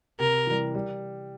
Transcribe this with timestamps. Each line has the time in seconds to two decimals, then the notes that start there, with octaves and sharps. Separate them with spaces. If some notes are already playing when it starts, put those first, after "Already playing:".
0.19 C3 A#4
0.47 E3 G3
0.75 G3